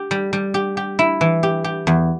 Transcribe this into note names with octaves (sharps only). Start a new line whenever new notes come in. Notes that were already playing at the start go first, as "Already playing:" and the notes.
Already playing: G4
G3
G3
G4
G4
E4
E3
G4
G4
E2